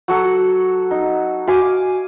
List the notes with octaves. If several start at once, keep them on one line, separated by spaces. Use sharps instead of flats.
F#3 F#4 A4
D#4
F#4 F5 G#5 D6